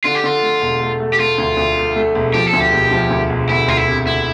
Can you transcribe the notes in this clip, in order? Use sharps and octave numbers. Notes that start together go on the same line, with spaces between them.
D3 F4
G4
D3 F4
A3
E1
A3
A3
G4
A3 F4
D2
D2
A3
A3
E1
F3 G4
A4
D2
G4
E1
F3
D2
E1
D2 E4
D2 F4
E4
C3
D2 E4